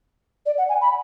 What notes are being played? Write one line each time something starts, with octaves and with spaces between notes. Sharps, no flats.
D5
F#5
G#5
B5